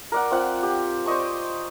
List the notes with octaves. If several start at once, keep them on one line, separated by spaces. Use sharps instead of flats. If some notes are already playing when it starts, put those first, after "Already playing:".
A#4 D5 F#5
C4 F4 F#5
G4
C5 D5 D#5 C#6